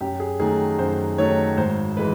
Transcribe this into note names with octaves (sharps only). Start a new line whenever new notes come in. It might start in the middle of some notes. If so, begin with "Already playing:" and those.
F#2 G4
G#4
D#3 F#3 A3 G#4
F#2 C5
D#3 F#3 A3 C#5
G#1 C5
E3 G#3 B4